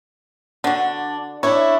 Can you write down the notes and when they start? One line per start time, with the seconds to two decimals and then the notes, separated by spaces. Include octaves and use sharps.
0.64 D3 D4 F#4
1.43 D4 E4 C#5